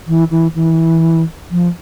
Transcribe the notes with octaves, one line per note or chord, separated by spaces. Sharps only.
E3
E3
E3
F3